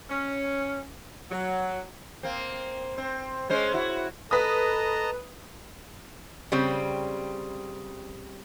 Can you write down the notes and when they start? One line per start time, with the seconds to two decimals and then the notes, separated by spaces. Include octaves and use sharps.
0.10 C#4
1.31 F#3
2.23 A#3 C4
2.98 C4
3.50 G#3 C#4 C5
3.74 E4 F#4
4.31 A4 B4 D#5 A5 A#5 D#6
6.52 C#3 G3 C4